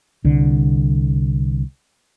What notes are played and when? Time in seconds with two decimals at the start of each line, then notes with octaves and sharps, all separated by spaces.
0.24 C2 D3